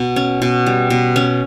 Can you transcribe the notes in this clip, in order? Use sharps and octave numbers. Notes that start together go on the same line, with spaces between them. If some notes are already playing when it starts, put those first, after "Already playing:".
Already playing: B2
C#4
B2
G3
B2
C#4